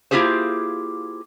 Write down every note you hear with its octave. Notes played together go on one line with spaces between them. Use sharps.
A#3 E4 F4 G4 G#4 C5